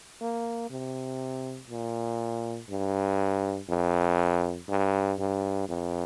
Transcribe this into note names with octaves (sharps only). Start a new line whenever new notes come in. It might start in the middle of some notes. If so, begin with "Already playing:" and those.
A#3
C3
A#2
G2
F2
G2
G2
F2